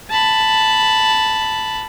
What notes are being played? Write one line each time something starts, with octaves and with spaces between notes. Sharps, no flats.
A5 B5